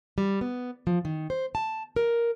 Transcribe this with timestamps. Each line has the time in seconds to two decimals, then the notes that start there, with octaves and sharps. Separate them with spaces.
0.18 G3
0.41 B3
0.87 F3
1.05 D#3
1.30 C5
1.55 A5
1.96 A#4